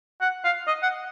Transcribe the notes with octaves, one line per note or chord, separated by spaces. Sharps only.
F#5
F5
D#5
F#5